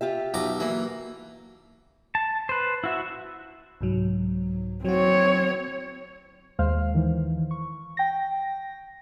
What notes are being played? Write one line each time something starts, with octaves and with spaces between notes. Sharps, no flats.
F4 G4 E5
B1 A#5 D6
E3 F#3 A#3
A5
B4 C5
E4 F#4 E5
C2 G#2 F#3
F#3 C4 F#4 C#5
D#2 G#3 C5 F5 F6
D#3 E3
C#6
G5 A#6